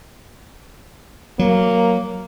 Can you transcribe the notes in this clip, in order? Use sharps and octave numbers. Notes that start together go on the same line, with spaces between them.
F#3 A#3